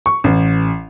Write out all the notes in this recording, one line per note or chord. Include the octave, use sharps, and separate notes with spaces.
C#6
A1